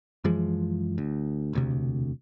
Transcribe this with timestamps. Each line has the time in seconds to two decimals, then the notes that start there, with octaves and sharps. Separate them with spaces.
0.24 F#2 E3 F3 G#3
0.98 D2
1.53 E1 D2 C3